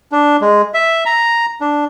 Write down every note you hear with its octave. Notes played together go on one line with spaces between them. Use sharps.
D4
G#3
E5
A#5
D4